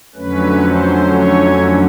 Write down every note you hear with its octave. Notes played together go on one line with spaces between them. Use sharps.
F2 D3 F#3 A3 C#4 B4
C5
C#5